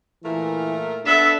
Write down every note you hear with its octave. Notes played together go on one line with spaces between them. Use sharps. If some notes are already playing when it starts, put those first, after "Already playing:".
A#2 E3 A3 A#4
B3 D4 A4 E5